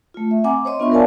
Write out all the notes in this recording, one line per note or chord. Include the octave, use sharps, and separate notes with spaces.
A3 F4
E5
C4 F#5 G#5 A#5 D6
C5 C#5 D#5 C6
B3 D4 F4 E5 C#6
A#4 C#5 D5 F5 G#5 A5